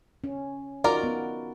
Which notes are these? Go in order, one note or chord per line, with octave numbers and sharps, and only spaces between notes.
C#4
D#4 F4 F#4 A#4 D5
B3